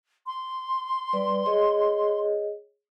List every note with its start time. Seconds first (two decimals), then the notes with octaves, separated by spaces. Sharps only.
0.26 C6
1.13 G3 B4 D5
1.46 G#4 C#5 D#5